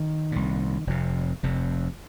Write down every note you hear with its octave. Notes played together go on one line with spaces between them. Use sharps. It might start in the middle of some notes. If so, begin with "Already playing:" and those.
Already playing: D#3
C2 A#2
F1 F2 C3
F1 F2 C3